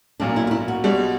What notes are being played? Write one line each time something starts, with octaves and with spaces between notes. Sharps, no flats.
B1 A#2 F#3 A#3 D4
E4
F#4
E4
F#4
B1 B2 G3